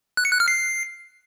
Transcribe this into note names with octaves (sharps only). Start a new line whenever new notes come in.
F#6
C#7
F#6
F6
C7